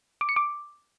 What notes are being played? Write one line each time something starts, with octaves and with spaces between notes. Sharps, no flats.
D6
C#7
D6